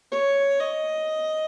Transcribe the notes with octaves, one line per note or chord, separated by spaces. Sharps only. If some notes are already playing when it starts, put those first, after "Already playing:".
C#5
D#5